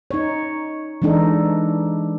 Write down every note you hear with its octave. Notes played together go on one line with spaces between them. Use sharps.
D#4 C#5
E3 G#3 D4 D#4 A4